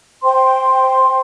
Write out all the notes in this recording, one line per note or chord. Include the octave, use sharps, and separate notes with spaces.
C5 G5 C6